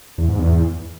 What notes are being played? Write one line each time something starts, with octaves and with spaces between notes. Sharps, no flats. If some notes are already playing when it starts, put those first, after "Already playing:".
E2
G#2
E2